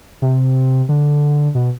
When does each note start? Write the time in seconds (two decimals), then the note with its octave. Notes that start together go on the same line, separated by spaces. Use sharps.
0.22 C3
0.89 D3
1.55 B2